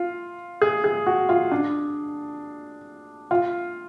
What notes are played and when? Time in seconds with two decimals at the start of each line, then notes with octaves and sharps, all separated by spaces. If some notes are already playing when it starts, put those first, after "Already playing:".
Already playing: F4
0.62 G#4
0.84 G#4
1.07 F#4
1.29 F4
1.52 D4
3.31 F4